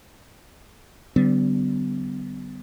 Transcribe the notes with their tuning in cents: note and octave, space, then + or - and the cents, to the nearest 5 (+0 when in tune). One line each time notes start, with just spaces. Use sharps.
D3 -15 G3 -40 B3 +25